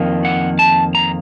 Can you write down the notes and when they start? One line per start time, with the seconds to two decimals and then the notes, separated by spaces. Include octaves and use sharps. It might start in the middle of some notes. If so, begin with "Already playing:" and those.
Already playing: F2 D#3 A#3
0.25 F#5
0.59 A5
0.95 A#5